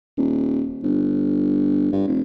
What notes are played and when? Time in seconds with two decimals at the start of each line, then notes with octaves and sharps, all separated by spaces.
0.18 D#1
0.84 G1
1.92 G2
2.07 F1